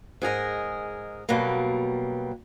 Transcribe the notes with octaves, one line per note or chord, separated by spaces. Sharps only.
G#2 G#4 A#4 D#5
B2 F#3 G3 A#3